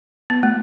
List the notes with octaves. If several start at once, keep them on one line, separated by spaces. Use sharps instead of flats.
B3
A3